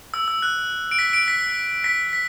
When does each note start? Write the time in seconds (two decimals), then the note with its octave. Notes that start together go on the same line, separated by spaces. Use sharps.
0.14 E6
0.28 E6
0.42 F#6
0.91 D7
0.99 B6
1.13 D7
1.28 B6
1.84 B6
2.13 B6